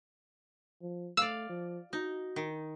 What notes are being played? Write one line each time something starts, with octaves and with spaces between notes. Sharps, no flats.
F3
A3 D5 F5 E6
F3
D#4 F#4
D#3